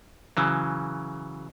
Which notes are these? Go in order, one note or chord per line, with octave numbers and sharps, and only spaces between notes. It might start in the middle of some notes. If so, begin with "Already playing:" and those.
C#3 E3 F#3